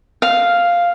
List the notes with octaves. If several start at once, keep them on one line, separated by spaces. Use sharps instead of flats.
F5